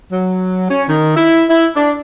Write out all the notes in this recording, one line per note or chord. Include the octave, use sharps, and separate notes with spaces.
F#3
C#4
D#3
E4
E4
D4